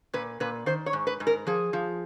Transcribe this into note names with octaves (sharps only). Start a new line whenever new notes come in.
A#2 B4
A#2 B4
D#3 C5
C#5
G#2
B4
G#2
A#4
F3 G#4
F3